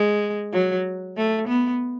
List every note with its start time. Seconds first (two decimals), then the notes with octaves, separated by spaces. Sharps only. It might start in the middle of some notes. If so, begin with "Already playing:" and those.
Already playing: G#3
0.53 F#3
1.17 A3
1.48 B3